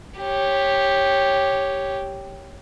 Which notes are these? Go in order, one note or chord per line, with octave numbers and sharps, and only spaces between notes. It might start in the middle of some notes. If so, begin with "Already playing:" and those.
G4 C#5